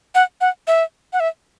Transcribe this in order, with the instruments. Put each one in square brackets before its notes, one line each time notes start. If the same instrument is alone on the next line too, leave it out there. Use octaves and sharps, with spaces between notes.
[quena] F#5
F#5
E5
F#5
E5